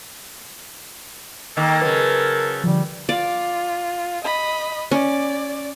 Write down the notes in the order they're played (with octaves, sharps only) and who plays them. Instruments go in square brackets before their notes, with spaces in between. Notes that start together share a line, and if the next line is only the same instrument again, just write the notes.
[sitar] D#3 A#3 [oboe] A4 [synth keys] D#5
[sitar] C#3 F#3 [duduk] A#4 [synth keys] B4
[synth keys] D3 F3 [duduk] G3
[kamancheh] F4 [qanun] D5
[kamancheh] D#5 B5
[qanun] C#4 [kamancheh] D5